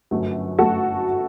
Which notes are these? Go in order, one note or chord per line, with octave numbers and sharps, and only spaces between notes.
G1 F#2 F#3 A3
F#3 A3 F#4 A4